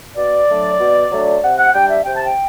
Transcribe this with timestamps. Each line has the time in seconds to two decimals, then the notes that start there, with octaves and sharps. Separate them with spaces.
0.16 B2 D5
0.48 F#3 A3 D4
0.80 B2
1.11 F#3 A3 D4
1.43 C3 F#5
1.58 F#5
1.74 G3 D4 G5
1.90 E5
2.05 C3 G5
2.16 A5
2.26 G5